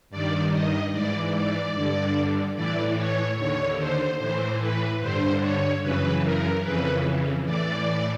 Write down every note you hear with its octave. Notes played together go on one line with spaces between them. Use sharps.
G2 D#3 D5
D#5
G#2 E3 D5
D5
G2 D3
A2 E3 D5
C#5
D#2 D3 C#5
C5
A2 E3 C5
B4
G2 D3 C5
C#5
F#2 C#3 E3 B4
A#4
F2 C#3 E3 B4
A2 E3 D5